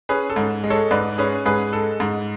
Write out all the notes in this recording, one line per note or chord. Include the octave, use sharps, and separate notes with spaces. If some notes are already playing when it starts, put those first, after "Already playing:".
C#4 G#4 B4
A4
G#2
G#3
A4 C#5
G#2 B4 D5
C#4 G#4 B4
G#2 G#4 B4
G#3 A4
G#2